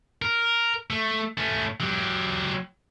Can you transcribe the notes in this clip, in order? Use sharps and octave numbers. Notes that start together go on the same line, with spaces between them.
A#4
A3
A3 C#4
F#3 G4